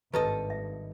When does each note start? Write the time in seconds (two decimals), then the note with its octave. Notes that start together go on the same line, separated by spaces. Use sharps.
0.14 G#1 G2 D#3 A4 B4 D#5
0.50 E5